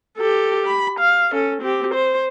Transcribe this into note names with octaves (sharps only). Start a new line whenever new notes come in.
G4 A4
B5
F5
C#4 A4
C4 G4
C5